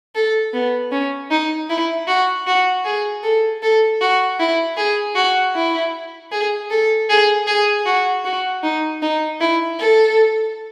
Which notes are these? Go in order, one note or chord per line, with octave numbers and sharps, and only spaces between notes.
A4
B3
C#4
D#4
E4
F#4
F#4
G#4
A4
A4
F#4
E4
G#4
F#4
E4
G#4
A4
G#4
G#4
F#4
F#4
D#4
D#4
E4
A4